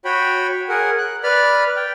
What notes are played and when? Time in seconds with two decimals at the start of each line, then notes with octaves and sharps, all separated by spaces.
0.05 F#4 C#5 G5 B5
0.69 G#4 A#4 F#5
0.98 F#6
1.23 B4 D5 B5 F6
1.76 G5